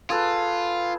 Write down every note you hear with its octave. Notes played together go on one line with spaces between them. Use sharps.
F4 G#4 A4 B4